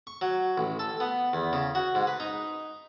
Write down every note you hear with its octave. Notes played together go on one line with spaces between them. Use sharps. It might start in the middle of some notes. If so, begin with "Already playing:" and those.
C#6
F#3
A1
A4
B3
E2
C#3
F#4
G#2
B4
D#4